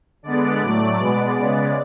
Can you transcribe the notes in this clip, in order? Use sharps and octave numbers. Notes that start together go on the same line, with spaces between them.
D3 G#3 B3 D5
A2 F#3 A3
B2 G#3 B3
C#3 G#3 B3